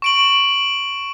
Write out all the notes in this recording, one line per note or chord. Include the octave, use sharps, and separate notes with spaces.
C#6 D7 F#7